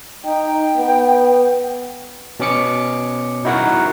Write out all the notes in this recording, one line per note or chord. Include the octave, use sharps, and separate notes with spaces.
D#4 G5
B3
B2 C#4 D6 C#7
D#4 E4 F#4 A#4 F#5